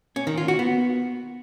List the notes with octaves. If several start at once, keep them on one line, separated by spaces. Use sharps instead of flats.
C#4
D#3
F4
F#4
B3